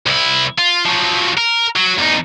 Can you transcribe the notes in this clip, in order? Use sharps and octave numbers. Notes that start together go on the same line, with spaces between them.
C2 E4
F4
F3 F#3
A#4
F#3
E2 D#4